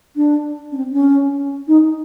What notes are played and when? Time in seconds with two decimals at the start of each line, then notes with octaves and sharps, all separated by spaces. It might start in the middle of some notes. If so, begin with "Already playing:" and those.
0.16 D4
0.72 C#4
0.77 C4
0.93 C#4
1.68 D#4